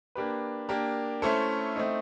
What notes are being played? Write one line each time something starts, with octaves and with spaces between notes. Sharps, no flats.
A#3 D4 G4 B4
A#3 D4 G4 A#4
A3 C#4 E4 A4 C5
A3 C4 D#4